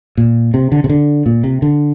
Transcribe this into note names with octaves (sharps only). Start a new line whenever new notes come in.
A#2
C3
D3
C3
D3
A#2
C3
D3